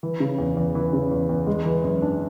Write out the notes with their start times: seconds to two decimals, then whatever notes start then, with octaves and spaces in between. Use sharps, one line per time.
0.03 E3
0.20 C#3
0.38 E2
0.57 E2
0.75 E3
0.93 C#3
1.12 E2
1.29 E2
1.47 G#3
1.65 E3
1.84 F#2
2.02 D4